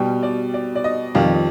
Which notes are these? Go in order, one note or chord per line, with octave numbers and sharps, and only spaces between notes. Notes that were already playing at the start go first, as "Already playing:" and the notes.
Already playing: B2 G3 G5
D5
D5
D5
D#5
F2 D#3 G3 F5